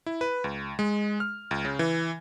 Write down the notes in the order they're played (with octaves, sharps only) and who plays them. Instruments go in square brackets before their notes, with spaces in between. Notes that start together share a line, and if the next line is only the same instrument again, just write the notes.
[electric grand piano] E4
B4
C#2
G#3
F6
C#2
C#3
E3